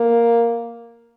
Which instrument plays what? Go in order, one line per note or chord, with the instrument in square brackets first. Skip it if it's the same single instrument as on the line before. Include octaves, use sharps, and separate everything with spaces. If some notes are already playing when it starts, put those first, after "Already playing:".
Already playing: [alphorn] A#3